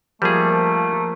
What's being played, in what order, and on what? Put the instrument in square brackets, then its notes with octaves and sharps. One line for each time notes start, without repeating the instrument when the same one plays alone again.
[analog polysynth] F3 A#3 [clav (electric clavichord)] G3 G#4 [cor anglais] A3